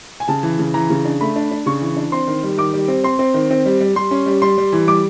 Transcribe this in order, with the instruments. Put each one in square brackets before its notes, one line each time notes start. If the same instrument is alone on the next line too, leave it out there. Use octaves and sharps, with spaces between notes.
[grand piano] G#5
C#3 A5
E3
C#3
E3 A#5
C#3
D4
A3 B5
D4
D4
C#3 C#6
E3
D4
C4 C6
D#3
G3
D#3 D6
G3
C4
C4 C6
C4
D#3
C4
G3
G3
G3 C6
C#4
G3
G3 C6
G3
E3
G3 D6